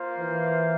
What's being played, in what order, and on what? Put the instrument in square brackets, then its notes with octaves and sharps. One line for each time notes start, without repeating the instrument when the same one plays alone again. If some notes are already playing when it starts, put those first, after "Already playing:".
Already playing: [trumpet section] A#3 F4 C5 F5
[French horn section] E3